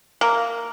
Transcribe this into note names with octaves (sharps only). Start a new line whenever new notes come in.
A#3